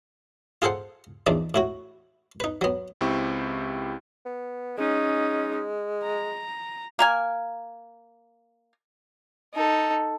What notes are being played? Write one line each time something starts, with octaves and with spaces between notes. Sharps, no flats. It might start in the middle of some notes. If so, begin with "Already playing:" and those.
F4 G#4 A4 C5 F#5
A#1 E2 D4 D#4 D5
A2 E4 F#4
D#4 B4
F#3 B3
C#2 C4 E4 G4 C#6
B3
G#3 C#4 D#4
A#5
A#3 A#4 G#5
D#4 A4